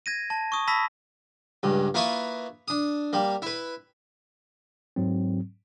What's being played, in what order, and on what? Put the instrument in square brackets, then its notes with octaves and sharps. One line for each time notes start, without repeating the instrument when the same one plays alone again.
[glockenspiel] G#6 A#6 D#7
A5
C#6 D#6
A5 B5 E6 A#6 B6
[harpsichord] C#2 G2
A#3 E4 F4 B4 C#6 D#6
D4 D#6
G3 A#3
E4 B4
[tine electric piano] G#2 F#3 C4